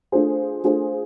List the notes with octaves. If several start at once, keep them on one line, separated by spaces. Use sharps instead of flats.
A3 D4 F4 G#4 C5
A3 D4 F4 G#4 C5